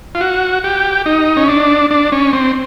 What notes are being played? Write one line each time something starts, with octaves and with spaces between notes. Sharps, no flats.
F4
F#4
G4
D#4
C#4
D4
D4
C#4
C4